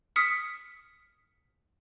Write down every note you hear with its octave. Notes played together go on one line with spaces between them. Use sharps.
D#6 F6 B6 C#7